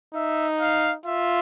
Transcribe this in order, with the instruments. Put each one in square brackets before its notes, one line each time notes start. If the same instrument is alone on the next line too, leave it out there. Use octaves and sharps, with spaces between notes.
[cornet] D#4 [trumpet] E5
[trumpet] F5
[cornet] F4 [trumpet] E5